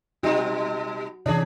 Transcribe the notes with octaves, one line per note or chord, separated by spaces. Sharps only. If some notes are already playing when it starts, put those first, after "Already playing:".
B2 G3 D#4 F#4
C3 E3 C#4 D4 G#4